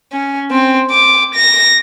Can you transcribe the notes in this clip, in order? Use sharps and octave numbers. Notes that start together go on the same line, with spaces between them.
C#4
C4
D6
A#6